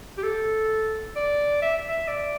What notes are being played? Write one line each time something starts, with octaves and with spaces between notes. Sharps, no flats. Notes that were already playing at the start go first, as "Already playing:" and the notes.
G4
A4
D5
E5
E5
D5